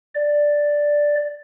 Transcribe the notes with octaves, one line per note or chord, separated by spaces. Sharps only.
D5